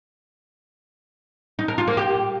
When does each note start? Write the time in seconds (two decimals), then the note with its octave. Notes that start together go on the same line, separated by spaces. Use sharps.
1.59 D#4
1.68 A#4
1.78 F4
1.88 A#3
1.97 G4